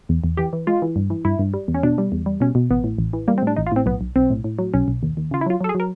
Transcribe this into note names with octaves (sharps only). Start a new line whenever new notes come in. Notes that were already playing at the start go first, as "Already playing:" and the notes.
E2
E2
E3 G4
E3
G#3 F4
E3
G2
E3
G2 E4
G2
G3
E2
C#4
B2 D4
G3
E2
G3
B2 C#4
B2
A1 B3
A2
A1
E3
G3 A#3
C4
A2 D4
A1 D#4
F4
A2 C4
B1 B3
B1
B1 C4
A2
A2
F#3
B1 C#4
B1
D#2
D#2
C#3 F4
E4
F#3 F4
F#3 A4
G#4
F#3 A#4